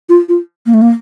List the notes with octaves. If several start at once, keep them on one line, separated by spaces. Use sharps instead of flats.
F4
F4
A#3
A3
A#3